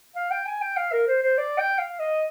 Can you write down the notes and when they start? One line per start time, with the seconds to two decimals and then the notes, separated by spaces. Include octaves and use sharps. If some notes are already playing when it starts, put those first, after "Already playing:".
0.16 F5
0.31 G5
0.47 G#5
0.62 G5
0.77 F5
0.92 A#4
1.07 C5
1.23 C5
1.38 D5
1.58 G5
1.79 F5
1.99 D#5